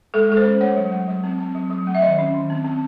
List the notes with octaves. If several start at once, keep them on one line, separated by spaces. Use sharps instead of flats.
G#3 A4
G#3 A4
C5
C#4
A3 C#5
F#3
A3
F#3
C4
C4
F#3
F#3
A3
E5
D#3 D#5
C#4
D#3
C4
C4